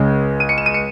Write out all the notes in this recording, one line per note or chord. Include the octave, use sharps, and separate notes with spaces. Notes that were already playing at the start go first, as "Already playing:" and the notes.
Already playing: C#2 C#3 G#3 C#4
D#7
C#7
E7
D#7
C#7